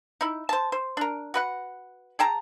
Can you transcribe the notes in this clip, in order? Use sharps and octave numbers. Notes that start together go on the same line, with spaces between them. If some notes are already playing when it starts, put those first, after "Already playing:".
D#4 E4
C5 A5
C5
D4 A#4
F#4 B4 F#5
G#4 G5 A5 A#5